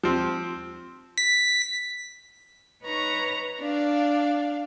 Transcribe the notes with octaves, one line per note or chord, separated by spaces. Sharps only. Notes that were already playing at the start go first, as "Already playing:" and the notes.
F3 C4
B6
D#4 B4 C#5 A#5 C#6
D4 D5 F5